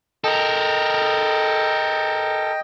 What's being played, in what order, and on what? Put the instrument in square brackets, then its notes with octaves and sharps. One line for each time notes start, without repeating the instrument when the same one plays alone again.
[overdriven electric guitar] A4 A#4 [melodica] D#5 G5